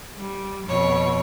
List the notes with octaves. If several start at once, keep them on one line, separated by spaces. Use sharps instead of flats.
G3
F2 B2 C#5